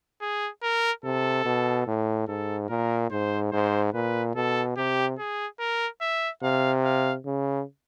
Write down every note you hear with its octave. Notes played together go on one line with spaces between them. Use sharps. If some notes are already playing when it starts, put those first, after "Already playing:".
G#4
A#4
C3 A4
B2
A2
G#2 A4
A#2 A#4
G#2 C5
G#2 C5
A#2 B4
B2 A4
C3 G4
G#4
A#4
E5
C3 F5
F5
C#3